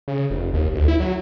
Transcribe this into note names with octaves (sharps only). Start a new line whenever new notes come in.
C#3
F1
D#2
D2
E4
F#3